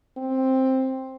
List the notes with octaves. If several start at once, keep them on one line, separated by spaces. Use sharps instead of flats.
C4